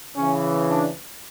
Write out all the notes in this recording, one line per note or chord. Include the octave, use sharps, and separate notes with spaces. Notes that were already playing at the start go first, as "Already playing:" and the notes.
C#3 E3 C#4
D4